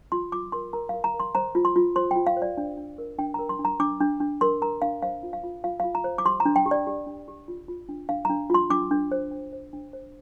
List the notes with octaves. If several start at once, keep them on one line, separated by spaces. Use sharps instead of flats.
F4 C6
F4 D6
A#4 C6
A#4 A#5
A#4 F5
A#5
A#4
C6
C5 A#5
F4
C6
F4
C5 C6
F4 G5
F5
C5
D5
D4
D4
A#4
D4 G5
A#4 A#5
C6
D4
A#5
D4 D6
D4
D4
A#4 C6
A#4 A#5
D4 F5
C5 F5
F4
F5
F4
F4 F5
F4 F5
A#5
C5
D6
G4 C6
A#5
D4
G5
G4
D5
G4
D4
G4
F4
F4
D4
D4 F5
D4 A#5
F4 C6
D4 D6
D4
C5
D4
C5
D4
C5